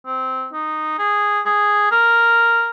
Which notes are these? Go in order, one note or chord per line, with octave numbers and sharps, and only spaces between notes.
C4
D#4
G#4
G#4
A#4